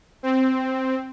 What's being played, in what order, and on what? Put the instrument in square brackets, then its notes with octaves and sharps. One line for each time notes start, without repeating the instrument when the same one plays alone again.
[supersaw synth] C4